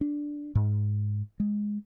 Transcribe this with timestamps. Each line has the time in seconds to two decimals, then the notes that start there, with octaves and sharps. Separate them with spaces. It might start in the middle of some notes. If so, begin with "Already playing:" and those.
0.01 D4
0.55 G#2
1.40 G#3